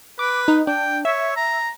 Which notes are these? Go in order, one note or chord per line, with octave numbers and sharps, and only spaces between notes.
B4 D6
D#4
D4 G5
C#5 E5
A#5